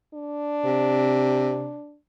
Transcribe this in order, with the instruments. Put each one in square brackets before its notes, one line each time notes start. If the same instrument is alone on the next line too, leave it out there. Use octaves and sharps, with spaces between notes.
[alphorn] D4
[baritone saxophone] C3